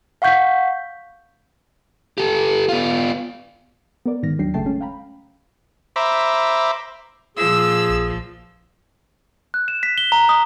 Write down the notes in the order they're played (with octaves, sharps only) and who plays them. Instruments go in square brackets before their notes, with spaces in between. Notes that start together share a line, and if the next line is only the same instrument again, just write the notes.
[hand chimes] F5 F#5 C#6 G6 B6
[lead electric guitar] G4 A4
B3 F4
[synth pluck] B3 A#4 D5
G#2 D#3 F6 A#6
D#2 F#3 D4 G5 C7
G1 C#3 A3 G5 A5 C7
G#3 C#4
F5 G5 A#5 B5
[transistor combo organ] C5 E5 A#5 B5 D6
[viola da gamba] A#2 F3 [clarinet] G#4 [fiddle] E6
[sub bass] A#1
[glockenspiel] F#6
E7
B6
G7
A#5
D#6